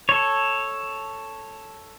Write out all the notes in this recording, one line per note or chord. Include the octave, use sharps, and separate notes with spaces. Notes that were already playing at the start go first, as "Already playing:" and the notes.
A4 C#5